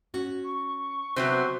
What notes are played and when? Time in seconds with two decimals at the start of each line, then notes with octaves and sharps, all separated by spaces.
0.14 C#4 F#4
0.44 C#6
1.16 C3 F#3 B3 C5